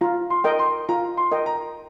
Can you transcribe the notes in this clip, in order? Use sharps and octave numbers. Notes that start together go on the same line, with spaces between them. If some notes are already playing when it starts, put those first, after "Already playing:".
F4 A#5
C6
A#4 D#5 G5
C6
F4 A#5
C6
A#4 D#5 G5
A#5